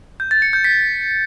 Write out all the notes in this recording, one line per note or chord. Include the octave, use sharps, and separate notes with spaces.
G6
A6
C#7
G6
B6